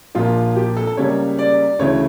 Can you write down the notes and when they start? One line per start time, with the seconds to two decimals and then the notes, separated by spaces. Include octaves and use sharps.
0.15 A#1 A#2 F3 A#3 F4
0.56 G4
0.77 A4
0.87 A4
0.97 C#2 C#3 G3 A#3 C#5
1.39 D5
1.79 D2 C#3 E3 A3 C#5